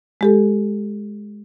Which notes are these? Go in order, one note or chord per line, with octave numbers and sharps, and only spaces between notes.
G#3 G4 A4